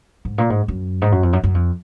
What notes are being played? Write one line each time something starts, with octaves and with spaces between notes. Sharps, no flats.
G#2
A#2
G#2
F#2
G#2
F#2
F2
F#2
F#2
F2